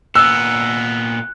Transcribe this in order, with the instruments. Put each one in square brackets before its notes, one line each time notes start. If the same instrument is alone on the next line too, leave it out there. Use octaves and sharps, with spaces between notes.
[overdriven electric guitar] A#2 B3 [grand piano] E6 [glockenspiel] F#6